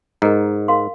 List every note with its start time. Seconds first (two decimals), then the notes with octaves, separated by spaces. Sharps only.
0.22 G#2 A#4 D#5 A#5
0.68 A#4 F5 C6